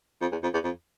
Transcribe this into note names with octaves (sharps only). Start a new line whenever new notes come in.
F2
E2
F2
E2
F2